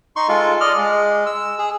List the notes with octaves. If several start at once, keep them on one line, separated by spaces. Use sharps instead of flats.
D#4 C6 C#6
G#3 F4 A4
D5 D#5 F6
G#3
E6
G#4